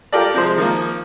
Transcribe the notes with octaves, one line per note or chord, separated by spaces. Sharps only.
F4 G4 A4 A#4 D5
C3 F3 G#3 C5
D#3 F3 A#3